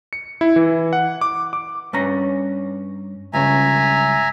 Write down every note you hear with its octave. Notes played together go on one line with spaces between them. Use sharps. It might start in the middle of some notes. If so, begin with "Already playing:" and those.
C#7
E4
E3
F#5
D6
D6
G2 C#4 A#5
C#2 G2 C#3 E5 G#5 A#5